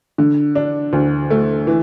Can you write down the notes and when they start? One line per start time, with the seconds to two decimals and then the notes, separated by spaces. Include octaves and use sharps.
0.18 D3
0.55 D4
0.93 D2
1.30 A3
1.67 E3